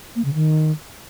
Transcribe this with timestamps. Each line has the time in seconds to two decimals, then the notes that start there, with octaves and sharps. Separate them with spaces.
0.16 A#3
0.25 C#3
0.34 D#3